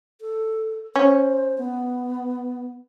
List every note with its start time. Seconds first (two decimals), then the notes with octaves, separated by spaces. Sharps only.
0.21 A4
0.96 C#4 C5
1.58 B3